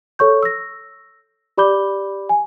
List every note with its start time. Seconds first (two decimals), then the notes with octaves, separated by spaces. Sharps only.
0.19 A4 C#5 C#6 G6
0.43 E6 A#6
1.58 G4 D5 B5 D6 G6 G7
2.29 G#5